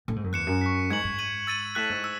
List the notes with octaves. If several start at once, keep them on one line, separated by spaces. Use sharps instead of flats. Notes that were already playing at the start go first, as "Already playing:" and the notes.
A2
G#2
F#2
E2 F#6 C#7 E7
F#2
C#6 F#6 B6
G#2 G#6 C#7 F#7
G#2
G#6 D#7 F#7
E6 A6 D#7 F#7
A2 F#6 B6 E7
G#2
E6